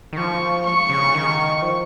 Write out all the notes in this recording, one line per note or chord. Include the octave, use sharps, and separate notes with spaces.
D#3
F3 C#6
C#6
C#3
D#3
F3